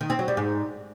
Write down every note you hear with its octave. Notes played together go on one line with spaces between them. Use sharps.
D#3
C4
F#3
G3
G#2